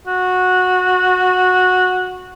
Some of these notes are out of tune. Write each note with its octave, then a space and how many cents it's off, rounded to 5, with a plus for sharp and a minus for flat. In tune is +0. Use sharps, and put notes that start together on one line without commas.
F#4 -15